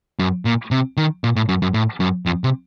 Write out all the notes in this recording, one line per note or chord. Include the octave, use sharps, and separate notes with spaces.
F#2
A#2
C3
D#3
A#2
A2
F#2
F#2
A2
F#2
F2
C3